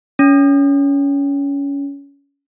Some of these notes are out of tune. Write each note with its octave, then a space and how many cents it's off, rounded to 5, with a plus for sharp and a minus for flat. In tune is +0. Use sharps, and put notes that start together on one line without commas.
C#4 +20